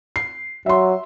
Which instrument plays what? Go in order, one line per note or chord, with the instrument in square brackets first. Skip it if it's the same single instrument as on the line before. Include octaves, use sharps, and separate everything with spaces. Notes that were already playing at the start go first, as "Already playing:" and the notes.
[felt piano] C7
[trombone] F#3 [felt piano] E5 C6